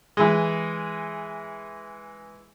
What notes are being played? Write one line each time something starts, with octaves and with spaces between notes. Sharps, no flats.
E3 G#3